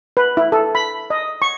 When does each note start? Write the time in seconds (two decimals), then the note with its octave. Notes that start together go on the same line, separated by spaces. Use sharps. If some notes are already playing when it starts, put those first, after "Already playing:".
0.17 B4
0.37 E4
0.52 A4
0.75 B5
1.10 D#5
1.42 C#6